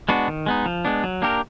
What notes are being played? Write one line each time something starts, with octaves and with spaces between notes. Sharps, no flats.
G#3 B3 D4 F#4
D#3
G#3 B3 D#4
F3
G#3 B3 D4
F#3
A#3 D4 G4 A#4